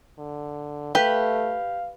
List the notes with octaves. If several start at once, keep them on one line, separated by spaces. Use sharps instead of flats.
D3
A3 G4 B4 F5